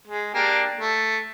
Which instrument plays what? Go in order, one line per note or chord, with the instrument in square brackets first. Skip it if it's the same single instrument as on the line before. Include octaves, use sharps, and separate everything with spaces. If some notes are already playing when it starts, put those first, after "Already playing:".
[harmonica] G#3
A#3 D4 G4
A3